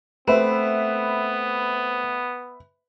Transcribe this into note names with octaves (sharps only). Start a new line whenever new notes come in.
A3 B3 C4 B4 E5